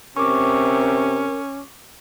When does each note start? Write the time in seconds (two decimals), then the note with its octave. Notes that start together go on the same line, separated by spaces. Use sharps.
0.17 C3 C#4 A#4 C#6 D6